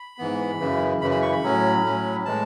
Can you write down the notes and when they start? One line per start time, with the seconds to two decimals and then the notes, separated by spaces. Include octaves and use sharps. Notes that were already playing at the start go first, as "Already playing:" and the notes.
Already playing: B5
0.18 G#2 E3 B3
0.60 F#2 C#3 E3
1.01 F#2 C#3 E3 B5
1.11 B5
1.22 C#6
1.32 B5
1.43 A2 F#3 C#4
1.84 A2 F#3 C#4
2.25 A2 E3 G#3 A5